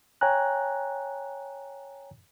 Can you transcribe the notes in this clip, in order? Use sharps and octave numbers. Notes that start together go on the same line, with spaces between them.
C#5 G5 G#5 A#5 F#6